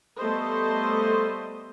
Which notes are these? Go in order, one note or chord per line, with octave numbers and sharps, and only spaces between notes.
G3 A3 B3 A4 C5 D#5